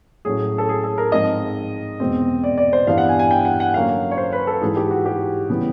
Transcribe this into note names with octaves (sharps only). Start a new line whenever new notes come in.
A2 F#3 A3 C#4 G#4
A4
G#4
A4
A#4
G#2 F3 G#3 C4 D#5
E2 B2 G#3 C4
D5
D5
C5
G2 E3 G3 B3 D4 F5
F#5
G#5
G#5
G5
F#5
F#5
D3 F#3 A#3 C#4 F5
C#5
C5
B4
A4
G#2 E3 G#3 G#4
G4
F#4
G4
C#3 E3 G3 B3